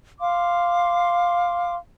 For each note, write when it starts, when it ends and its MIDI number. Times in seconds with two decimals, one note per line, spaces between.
0.21 1.74 77
0.21 1.74 84
0.21 1.74 86